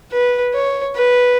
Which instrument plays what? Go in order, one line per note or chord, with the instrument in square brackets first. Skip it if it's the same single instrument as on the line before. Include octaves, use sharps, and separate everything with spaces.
[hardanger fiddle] B4
C#5
B4